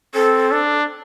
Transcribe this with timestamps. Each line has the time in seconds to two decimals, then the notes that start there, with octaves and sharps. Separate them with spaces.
0.14 C4 A4
0.52 D4